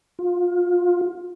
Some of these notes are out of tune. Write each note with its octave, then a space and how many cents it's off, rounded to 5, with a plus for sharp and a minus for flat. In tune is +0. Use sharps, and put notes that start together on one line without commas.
F4 +20